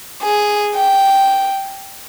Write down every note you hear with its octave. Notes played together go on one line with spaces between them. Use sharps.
G#4
G5